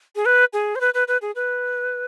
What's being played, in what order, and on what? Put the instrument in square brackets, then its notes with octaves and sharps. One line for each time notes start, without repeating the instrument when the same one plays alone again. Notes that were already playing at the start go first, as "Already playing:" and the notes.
[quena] G#4
B4
G#4
C5
B4
B4
B4
G#4
B4